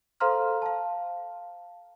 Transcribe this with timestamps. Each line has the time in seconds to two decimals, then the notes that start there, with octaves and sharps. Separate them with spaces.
0.20 A4 C5 F5 A#5 C6 F6
0.62 F5 A5